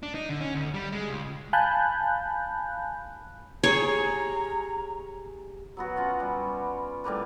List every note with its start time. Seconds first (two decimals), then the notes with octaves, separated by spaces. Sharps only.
0.03 D4
0.15 D#4
0.29 D3
0.41 C#4
0.55 D2
0.74 G3
0.92 G#3
1.10 C#2
1.53 F5 G#5 A5 B5 F#6 G6
3.64 G4 G#4 C#5 A#5
5.77 F#3 B3 F#4
5.96 C#4 F4 F#5
6.20 G3
7.04 A2 G3 A#3 B4